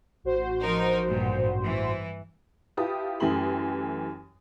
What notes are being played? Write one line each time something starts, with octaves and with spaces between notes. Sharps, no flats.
A1 F#4 C5
F3 D#4 A#4
G2 A#2
E3
E4 F4 G4 B4 A5 D#6
F#2 E3 A3 G4 C6 F#7